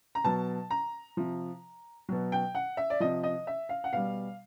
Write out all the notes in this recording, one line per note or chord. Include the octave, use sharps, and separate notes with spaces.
A#5
B2 F#3 A5
A#5
C3 F3
B2 F#3
G5
F#5
E5
D5
C3 F3 D#5
D#5
E5
F5
F#5
B2 G3 F5